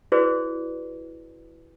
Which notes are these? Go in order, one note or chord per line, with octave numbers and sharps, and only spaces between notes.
E4 F#4 G#4 B4 C5 D5